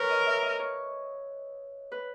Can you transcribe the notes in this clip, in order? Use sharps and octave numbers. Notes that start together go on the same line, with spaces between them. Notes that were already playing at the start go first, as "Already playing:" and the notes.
Already playing: A#4 B4 C#5
D#5
E5
D#5
C#5
B4